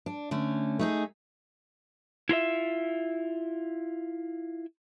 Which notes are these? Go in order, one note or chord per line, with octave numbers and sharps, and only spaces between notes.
D4
D3 A3 C#4
A3 D#4 G#4
E4 F4 A#4 E5